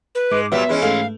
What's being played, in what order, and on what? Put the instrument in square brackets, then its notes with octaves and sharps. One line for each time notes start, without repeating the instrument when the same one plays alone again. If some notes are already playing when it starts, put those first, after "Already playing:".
[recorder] B4
[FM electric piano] G#2 D6 [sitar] G#3
[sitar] A#2 F#3 G3 [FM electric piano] B3 [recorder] E5
[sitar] E3 G#3 C#4 [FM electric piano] B4
[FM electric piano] G#2 A3 [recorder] F5